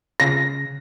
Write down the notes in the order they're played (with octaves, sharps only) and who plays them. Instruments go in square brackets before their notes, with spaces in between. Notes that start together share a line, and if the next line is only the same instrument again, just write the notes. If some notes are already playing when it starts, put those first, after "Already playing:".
[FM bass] C#3 [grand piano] A#6